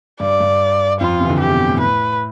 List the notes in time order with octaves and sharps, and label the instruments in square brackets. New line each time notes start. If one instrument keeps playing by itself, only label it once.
[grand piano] G2 [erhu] D5
[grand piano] G2
[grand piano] F2 [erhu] F4
[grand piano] C3 E3
D3
[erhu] G4
[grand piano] B2
A2
[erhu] B4